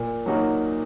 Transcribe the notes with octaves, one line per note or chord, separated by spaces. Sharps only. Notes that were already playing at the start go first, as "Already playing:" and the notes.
Already playing: A#2
F#3 A#3 D#4 F#4